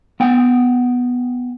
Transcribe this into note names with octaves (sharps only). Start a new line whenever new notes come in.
B3 F#5 G5